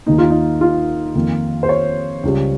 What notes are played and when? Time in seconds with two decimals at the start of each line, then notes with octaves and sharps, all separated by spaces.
0.06 D#2 D#3 A#3 D#4
0.18 F4
0.30 D#4
0.61 F4
1.15 F2 D#3 A#3
1.63 C5
1.69 C#5
2.24 C#2 C#3 G3